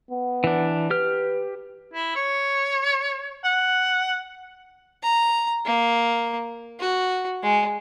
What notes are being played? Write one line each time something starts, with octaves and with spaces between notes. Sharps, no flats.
B3
E3 D4
G4 B4 F6
E4
C#5
F#5
A#5
A#3
F#4
G#3